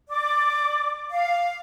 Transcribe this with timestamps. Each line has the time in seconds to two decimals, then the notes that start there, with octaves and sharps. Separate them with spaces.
0.09 D5 D6
1.10 F5